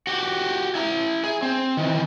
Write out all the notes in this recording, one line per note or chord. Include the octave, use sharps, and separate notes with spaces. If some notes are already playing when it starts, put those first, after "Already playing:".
F#4 G4
E4 A#5
G#4
C4
D#3 E3